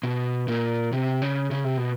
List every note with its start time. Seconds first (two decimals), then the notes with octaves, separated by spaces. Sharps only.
0.03 B2
0.48 A#2
0.92 C3
1.22 C#3
1.51 C#3
1.64 C3
1.77 B2